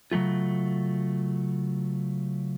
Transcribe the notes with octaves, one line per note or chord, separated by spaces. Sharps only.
C#3 F#3 G3 A3 F4